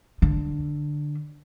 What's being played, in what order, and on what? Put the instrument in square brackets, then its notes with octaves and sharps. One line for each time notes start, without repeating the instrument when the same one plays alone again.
[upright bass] D3